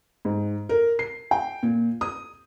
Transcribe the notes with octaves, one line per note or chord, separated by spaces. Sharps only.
G#2
A#4
C7
G5
A#2
D#6